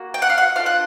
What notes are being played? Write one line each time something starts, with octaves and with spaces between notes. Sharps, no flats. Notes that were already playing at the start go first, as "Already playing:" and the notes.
Already playing: A#3 F#4
G5
F#5
F5
F#5
D4 F4 A4 F5
F#5